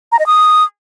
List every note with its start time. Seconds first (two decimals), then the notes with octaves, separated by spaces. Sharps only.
0.12 A#5
0.19 D#5
0.27 D#6